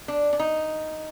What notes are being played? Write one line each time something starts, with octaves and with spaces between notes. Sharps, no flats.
D4
D4
D#4